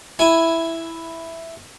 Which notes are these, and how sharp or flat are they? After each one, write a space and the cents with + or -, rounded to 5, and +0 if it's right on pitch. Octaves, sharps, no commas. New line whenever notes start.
E4 +0 G#5 +0